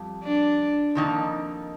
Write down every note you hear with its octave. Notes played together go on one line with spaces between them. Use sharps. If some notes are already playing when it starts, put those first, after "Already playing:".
Already playing: F2 G3
D4
F2 D#3 A#3 D#4